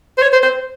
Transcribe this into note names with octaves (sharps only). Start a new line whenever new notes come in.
C5
C#5
C5
C5